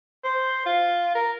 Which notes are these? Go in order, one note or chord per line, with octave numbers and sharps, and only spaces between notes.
C5
F4
A#4